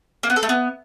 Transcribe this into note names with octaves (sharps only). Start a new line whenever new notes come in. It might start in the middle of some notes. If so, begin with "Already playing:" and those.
A#3
B3
A4
A3
B3